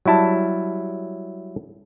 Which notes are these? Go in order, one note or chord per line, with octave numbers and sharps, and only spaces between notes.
F#3 G3 E4 A5